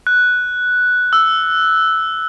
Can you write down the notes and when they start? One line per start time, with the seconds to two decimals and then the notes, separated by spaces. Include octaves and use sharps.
0.07 F#6
1.13 E6